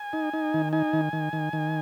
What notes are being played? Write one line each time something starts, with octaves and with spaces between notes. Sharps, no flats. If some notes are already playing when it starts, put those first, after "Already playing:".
Already playing: G#5
D#4
D#4
D#3
D#4 G#5
D#3
D#3
D#3
D#3